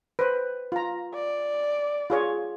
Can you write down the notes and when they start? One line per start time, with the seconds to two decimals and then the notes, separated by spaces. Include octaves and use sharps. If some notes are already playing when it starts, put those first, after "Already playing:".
0.19 B4 C5
0.72 F4 A#5
1.15 D5
2.10 F4 G#4 C#5